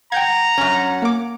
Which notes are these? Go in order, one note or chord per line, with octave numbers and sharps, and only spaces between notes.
F#5 G5 A#5 G6 G#6
F#2 C#4
A#3 D6